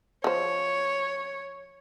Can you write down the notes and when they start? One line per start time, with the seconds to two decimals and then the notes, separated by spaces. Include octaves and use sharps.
0.24 F3 C5 C#5